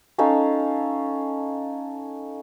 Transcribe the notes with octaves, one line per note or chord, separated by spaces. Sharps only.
C#4 D#4 A4 F5